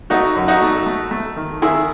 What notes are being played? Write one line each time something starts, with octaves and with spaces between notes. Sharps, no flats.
A3 D#4 F#4
F#2
D#4 F#4
A3
A3
A3
D#3
D#3 E4 G#4